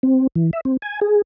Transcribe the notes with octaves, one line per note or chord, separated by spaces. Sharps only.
C4
E3
E5
C4
G#5
G#4